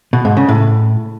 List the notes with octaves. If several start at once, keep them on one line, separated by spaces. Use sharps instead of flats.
B2
G#2
C#3
A2